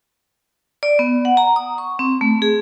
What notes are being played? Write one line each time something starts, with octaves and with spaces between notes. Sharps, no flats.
D5
B3
F#5
A#5
D#6
C#6
C4
A3
G#4